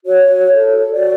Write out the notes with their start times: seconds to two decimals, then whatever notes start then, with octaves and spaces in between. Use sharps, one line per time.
0.05 F#4 C#5
0.50 A4 C#5
0.92 F#4 D5